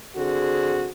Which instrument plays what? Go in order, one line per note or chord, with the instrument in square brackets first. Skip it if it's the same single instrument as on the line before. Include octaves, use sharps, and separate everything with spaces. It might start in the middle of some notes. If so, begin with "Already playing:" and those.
[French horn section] D3 C4 F#4 G#4